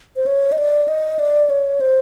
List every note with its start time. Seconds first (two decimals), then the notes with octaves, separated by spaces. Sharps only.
0.16 C5
0.26 C#5
0.52 D#5
0.58 D5
0.88 D#5
1.19 D5
1.50 C#5
1.81 C5